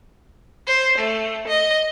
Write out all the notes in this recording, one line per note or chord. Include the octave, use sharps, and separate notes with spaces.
C5
A3
D#5